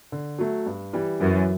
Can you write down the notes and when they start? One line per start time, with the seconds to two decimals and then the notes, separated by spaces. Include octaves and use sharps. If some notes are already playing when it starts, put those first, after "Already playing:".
0.12 D3
0.39 F#3 A3
0.66 G2
0.93 E3 G3
1.20 F#2 E3